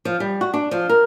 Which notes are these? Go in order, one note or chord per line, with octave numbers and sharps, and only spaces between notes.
F3
G3
F#4
D4
F3
A#4